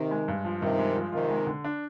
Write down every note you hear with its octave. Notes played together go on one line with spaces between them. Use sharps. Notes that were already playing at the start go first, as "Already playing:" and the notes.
Already playing: C3 D#3
G#3
G2
F3
G2 C3 D#3
G#3
F3
C3 D#3 F4
G#3
D3
D4